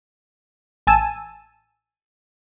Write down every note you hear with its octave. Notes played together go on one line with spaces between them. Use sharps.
A1 G#5 A5 E6 D#7